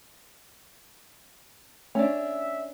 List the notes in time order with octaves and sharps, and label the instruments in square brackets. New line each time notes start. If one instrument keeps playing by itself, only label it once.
[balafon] A3 [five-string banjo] C#4 D4 [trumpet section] E5